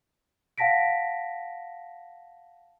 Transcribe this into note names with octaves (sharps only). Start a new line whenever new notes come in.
F5 F#5 A5 A#6 B6 D7